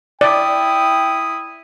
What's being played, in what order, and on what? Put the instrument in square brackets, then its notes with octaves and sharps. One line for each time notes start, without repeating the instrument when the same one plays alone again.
[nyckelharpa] E4 D#6 [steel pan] D5 [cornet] G5